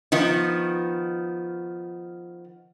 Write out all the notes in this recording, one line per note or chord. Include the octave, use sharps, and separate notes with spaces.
D#3 F3 B3